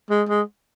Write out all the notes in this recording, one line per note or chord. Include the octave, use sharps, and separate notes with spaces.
G#3
G#3